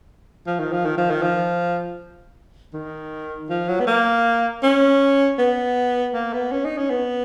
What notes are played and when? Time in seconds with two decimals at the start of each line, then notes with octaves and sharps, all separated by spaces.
0.46 F3
0.59 D#3
0.72 F3
0.85 D#3
0.97 F3
1.10 D#3
1.22 F3
2.74 D#3
3.49 F3
3.68 F#3
3.80 B3
3.87 A#3
4.63 C#4
5.38 B3
6.14 A#3
6.33 B3
6.51 C#4
6.65 D#4
6.78 C#4
6.90 B3